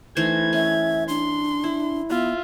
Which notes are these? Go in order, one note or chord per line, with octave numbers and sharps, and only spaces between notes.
E3 A3 D#4 C5 G#6
C#4 E5
D4 C6
E4
B3 F4 E5